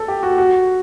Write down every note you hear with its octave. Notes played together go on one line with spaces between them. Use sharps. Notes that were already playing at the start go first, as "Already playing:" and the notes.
Already playing: A4
G4
F#4
F#4